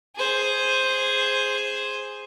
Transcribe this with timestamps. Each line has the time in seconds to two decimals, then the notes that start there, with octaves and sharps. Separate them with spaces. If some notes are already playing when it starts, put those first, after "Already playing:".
0.16 G#4 C5